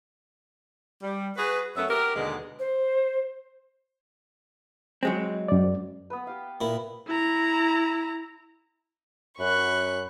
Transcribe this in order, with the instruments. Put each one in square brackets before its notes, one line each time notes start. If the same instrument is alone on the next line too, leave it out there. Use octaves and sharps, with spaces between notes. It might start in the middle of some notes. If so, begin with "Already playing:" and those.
[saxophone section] G3
F#4 G#4 B4
F#2 A3 B3 C#5 E5
F#4 G4 A#4
D#2 B2 D3 G#3
[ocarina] C5
[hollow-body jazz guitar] F#3 G#3 C4
[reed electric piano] F#2 D5
[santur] B3 B4
G4 F5
[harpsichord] A#2 E4
[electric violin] E4 A#5
[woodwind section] F#2 [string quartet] B5 C#6 F#6